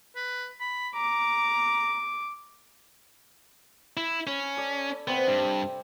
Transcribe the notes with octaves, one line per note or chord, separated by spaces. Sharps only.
B4
B5
A#5 D6
E4
C#4 B5
A4 D5
C3 B3 C4
G2